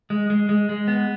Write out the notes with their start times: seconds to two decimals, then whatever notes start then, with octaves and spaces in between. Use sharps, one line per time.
0.10 G#3
0.30 G#3
0.49 G#3
0.69 G#3
0.88 B3